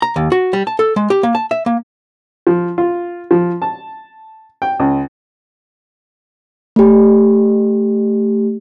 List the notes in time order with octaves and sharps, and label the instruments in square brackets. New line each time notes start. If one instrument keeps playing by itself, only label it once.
[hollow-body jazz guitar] A#5
D#2
F#4
G3
A5
A4
G#3
G4
A#3
A5
E5
A#3
[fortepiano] F3
F4
F3
A5
G5
C#2
[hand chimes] A3 G4